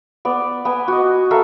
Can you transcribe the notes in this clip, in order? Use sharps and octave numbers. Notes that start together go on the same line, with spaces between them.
B3 D5
B3 G#5
F#4 D#5
A4 A#4 E5 F5